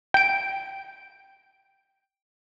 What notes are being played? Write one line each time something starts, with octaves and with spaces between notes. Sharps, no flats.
G5 D7